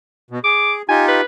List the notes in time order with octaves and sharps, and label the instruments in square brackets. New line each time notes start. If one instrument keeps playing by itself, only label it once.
[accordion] B2
[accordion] G#4 [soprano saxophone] D6
[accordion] D#4 F4 G4 [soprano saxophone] G#5
[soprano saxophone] B4